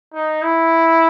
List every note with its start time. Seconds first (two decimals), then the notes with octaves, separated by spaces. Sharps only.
0.14 D#4
0.43 E4